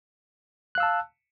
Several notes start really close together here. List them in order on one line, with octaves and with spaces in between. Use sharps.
F#6 F5 E6 A5